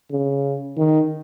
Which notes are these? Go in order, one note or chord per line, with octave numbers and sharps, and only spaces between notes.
C#3
D#3